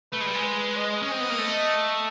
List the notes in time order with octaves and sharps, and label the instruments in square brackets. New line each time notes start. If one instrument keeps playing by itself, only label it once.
[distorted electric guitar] A3 [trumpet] B4
[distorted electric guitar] G#3
G3
G#3
[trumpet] B4
D#5
[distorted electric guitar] C#4
C4
B3
A#3
A3